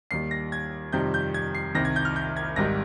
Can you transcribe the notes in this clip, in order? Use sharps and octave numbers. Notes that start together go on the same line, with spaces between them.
D#2 D#3 G3 C7
A#6
G#6
F2 C3 D#3 G3 G6
G6
G#6
C7
C2 C3 D#3 A#6
G#6
G6
F6
G6
G#6
G#1 G#2 D#3 G3 A#6